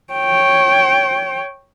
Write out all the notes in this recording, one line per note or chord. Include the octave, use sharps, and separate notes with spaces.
C#5 G5